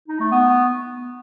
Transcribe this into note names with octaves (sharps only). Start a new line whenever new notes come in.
D#4
A3
B3